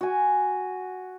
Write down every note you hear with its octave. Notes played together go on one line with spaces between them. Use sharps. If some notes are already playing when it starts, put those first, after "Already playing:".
F#4 G#5